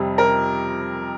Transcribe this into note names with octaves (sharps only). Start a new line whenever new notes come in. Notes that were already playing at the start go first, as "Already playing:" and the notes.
Already playing: F2 C3 G3
A#4